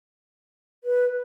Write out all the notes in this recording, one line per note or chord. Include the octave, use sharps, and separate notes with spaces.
B4